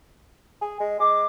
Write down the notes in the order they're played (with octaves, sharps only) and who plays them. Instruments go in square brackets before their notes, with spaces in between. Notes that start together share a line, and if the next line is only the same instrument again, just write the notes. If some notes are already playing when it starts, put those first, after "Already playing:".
[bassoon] G#4
G#3
[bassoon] G#3 [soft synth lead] D6